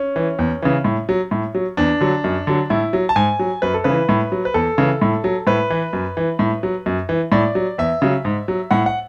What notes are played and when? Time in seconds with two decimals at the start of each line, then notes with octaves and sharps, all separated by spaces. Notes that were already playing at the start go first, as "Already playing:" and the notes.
Already playing: C#4
0.16 E3
0.39 E2
0.62 C#3 E3
0.84 A2
1.09 F#3
1.31 A2
1.55 F#3
1.77 E2 D4
2.01 D3 F#3
2.24 F#2
2.47 D3 F#3
2.70 A2 E4
2.93 F#3
3.09 A5
3.16 G#2 G#5
3.39 F#3
3.62 F#2 B4
3.74 A4
3.84 C#3 B4
3.90 E3
4.09 A2
4.32 F#3
4.45 B4
4.54 E2 A4
4.78 C#3 E3
5.02 A2
5.24 F#3
5.47 A2 B4
5.70 E3
5.93 F#2
6.17 E3
6.39 A2
6.63 F#3
6.86 F#2
7.09 E3
7.32 A2 D5
7.55 F#3
7.78 E2 E5
8.02 C#3 F#3
8.25 G#2
8.48 F#3
8.71 A2 F#5
8.86 F#5